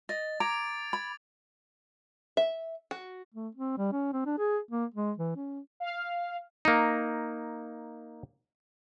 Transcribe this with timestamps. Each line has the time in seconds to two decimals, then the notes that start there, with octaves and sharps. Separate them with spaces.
0.09 D#5 A6
0.40 A#5 D6 G#6 D7
0.93 B5 G#6
2.37 E5
2.91 F#4
3.35 A3
3.55 C4
3.78 G3
3.92 C#4
4.13 C4
4.26 D4
4.38 G#4
4.71 A#3
4.94 G#3
5.18 E3
5.36 C#4
5.80 F5
6.65 A#3 D#4